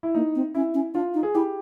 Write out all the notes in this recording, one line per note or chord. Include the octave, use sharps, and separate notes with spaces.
E4
A#3 D#4
C4
C#4 E4
C#4
D4 F4
D#4
G#4
E4 G4